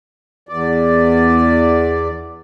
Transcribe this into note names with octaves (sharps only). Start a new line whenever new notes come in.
E2 D5